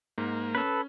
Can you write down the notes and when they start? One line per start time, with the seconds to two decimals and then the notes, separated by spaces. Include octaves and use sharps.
0.18 G#2 A#3
0.55 C#4 A4 B4